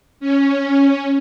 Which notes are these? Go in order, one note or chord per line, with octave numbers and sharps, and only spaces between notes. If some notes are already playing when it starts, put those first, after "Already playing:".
C#4